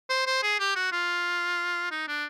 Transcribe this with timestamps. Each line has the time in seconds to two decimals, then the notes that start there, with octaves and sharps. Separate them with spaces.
0.09 C5
0.26 C5
0.42 G#4
0.59 G4
0.76 F#4
0.92 F4
1.91 D#4
2.08 D4